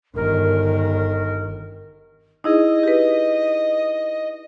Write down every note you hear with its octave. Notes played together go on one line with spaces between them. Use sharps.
G1 D#3 A#4
D#4 E4 G#4 D#5
G4 B4